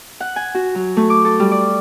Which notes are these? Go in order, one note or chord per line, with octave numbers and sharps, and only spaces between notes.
F#5
G#5
F#4
F#3
A3
D6
A4
G3
D5